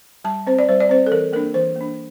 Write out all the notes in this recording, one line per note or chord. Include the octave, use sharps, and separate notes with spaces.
G3 A5
C4 C5
D5
G3 C5
D5
C4 C5
A4
E3 A#4
A#3 D4 A#4
E3 C5
A#3 D4